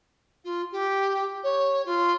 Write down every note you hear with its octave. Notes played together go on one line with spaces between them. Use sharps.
F4
G4
C#5
F4